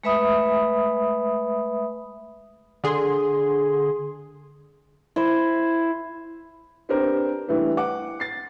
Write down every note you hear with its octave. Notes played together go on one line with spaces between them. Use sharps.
G#3 A3 B4 E5 B5 D#6
D3 G#4 C6
E4 C5
B3 C4 D4 G4 A#4 C5
E3 G3 A3 B3 D4
F#5 D6
A6 C7